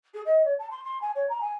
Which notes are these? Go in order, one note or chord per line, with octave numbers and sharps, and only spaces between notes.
G#4
D#5
C#5
A5
C6
C6
G#5
C#5
A#5
G#5